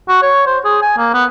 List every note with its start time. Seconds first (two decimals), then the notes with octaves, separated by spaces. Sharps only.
0.09 F#4
0.22 C#5
0.46 C5
0.65 G#4
0.82 G#5
0.98 A#3
1.14 B3